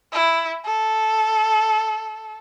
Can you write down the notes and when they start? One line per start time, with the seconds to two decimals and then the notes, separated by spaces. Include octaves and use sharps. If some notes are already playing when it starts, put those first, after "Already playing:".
0.13 E4
0.65 A4